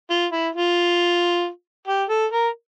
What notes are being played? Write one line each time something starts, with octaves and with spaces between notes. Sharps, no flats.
F4
E4
F4
G4
A4
A#4